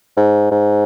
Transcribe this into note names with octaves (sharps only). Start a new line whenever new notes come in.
G#2
G#2